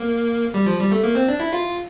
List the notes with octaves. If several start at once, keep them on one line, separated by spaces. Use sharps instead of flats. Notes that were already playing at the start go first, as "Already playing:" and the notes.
Already playing: A#3
G3
F3
G3
A3
A#3
C4
D4
E4
F4